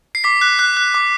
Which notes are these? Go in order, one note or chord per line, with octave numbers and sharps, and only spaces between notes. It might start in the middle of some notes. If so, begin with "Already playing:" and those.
C7
D6 B6
F#6
F#6
F#6
D6